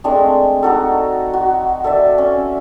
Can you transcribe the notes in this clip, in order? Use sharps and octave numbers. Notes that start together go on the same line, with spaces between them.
G#3 A3 C4 D4
D#4 F#4 A4
F#4
A4 D5 E5
C#4